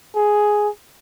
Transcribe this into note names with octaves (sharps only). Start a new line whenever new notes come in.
G#4